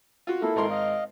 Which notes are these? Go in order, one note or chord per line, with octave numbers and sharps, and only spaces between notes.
F4 F#4
A#3 E4 A4
G#1 A#4 C6
D#5 F5